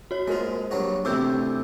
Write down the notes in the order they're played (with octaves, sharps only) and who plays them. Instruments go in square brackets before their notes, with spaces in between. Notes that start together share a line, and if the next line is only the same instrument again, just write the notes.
[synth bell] F#4 C#5
[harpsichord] G#3 F4 [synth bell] A#3 A#4 C5
[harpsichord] G2 F#3 F#4
[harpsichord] A1 D2 C3 [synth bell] D6 E6 G6